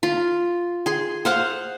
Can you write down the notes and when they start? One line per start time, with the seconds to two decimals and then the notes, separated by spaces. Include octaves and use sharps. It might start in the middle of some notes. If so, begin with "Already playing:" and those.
0.03 F4
0.86 G#4 C6
1.25 C5 F5 F#5